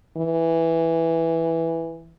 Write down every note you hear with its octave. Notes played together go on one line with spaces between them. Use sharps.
E3